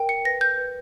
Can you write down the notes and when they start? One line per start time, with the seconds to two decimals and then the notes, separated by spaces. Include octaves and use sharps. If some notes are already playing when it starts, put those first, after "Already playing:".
Already playing: A#4 G5
0.09 C#7
0.25 B4 A#6
0.41 G6
0.58 B4